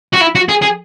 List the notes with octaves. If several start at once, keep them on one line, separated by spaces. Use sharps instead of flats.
F#4
E4
F#4
G#4
G#4